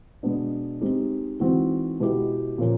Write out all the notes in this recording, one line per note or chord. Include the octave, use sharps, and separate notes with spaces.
B2 G#3 B3 D4
G#3 C4 D#4 G4
E3 G#3 C4 D#4 F#4
B2 G#3 B3 E4 G4
A#2 F3 A#3 C#4